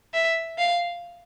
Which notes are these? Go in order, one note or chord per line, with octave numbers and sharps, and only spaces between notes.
E5
F5